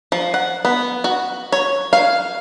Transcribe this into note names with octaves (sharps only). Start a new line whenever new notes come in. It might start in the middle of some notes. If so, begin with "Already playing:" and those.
F3
F#5
B3
F#4
C#5
F5